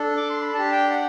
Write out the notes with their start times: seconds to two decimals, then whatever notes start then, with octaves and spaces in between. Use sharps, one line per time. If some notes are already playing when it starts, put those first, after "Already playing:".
Already playing: D4 A4
0.17 D6
0.30 C6
0.41 B5
0.54 D4 G4 A5
0.72 G5
0.90 F#5